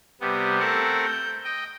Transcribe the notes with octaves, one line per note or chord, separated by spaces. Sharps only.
C3 G3 B3
A3 C4 A4 A#4 F#5
G6
D#5 G5